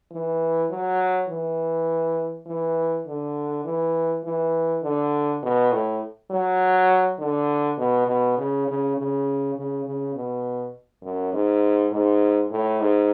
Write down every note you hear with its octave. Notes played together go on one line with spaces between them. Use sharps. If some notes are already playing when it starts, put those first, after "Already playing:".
E3
F#3
E3
E3
D3
E3
E3
D3
B2
A2
F#3
D3
B2
B2
C#3
C#3
C#3
C#3
C#3
B2
F#2
G#2
G#2
A2
G#2